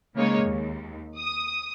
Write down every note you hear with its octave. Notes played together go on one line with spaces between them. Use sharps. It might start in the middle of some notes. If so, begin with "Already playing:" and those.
C#3 G#3 A#3 D#4 C#5
D#2
D#6